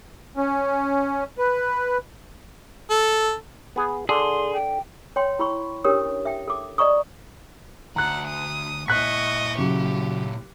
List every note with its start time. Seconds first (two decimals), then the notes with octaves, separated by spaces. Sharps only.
0.37 C#4
1.38 B4
2.90 A4
3.76 B3 G#4
4.09 D3 G#4 C6
4.53 G5
5.16 C#5 G5 C6
5.39 E4 B5 C#6
5.84 C#4 D4 G4 A#4 C#5 D#6
6.25 E5 G5
6.48 A4 D6
6.78 D5 D#5 A#5 C#6 D#6
7.96 D2 F#5 A#5 F#6
8.27 D#6
8.88 A#2 E4 D#5 C#6 F#6 B6
9.58 C#3 F#3 G4